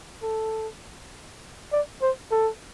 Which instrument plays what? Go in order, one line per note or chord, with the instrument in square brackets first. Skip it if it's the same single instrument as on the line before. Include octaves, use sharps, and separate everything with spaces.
[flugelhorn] A4
D5
C5
A4